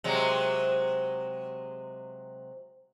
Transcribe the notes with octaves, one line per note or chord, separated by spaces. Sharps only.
C3 F#3 G#3